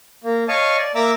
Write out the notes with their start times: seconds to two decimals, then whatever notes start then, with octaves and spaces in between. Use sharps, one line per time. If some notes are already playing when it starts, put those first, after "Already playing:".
0.24 A#3
0.48 C#5 D#5 F5 A5 C#6
0.78 D5
0.95 A#3 E5 A#5 D6 E6